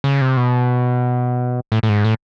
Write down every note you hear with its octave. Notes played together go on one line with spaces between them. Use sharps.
C#3
C3
B2
A2
A2
G#2
A2